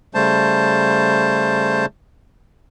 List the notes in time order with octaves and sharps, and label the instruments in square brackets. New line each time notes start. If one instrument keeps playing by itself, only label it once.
[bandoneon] C#3 G3 A3 C5 A5